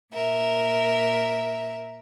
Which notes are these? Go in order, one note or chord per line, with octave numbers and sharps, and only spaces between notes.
A#2 A#4 E5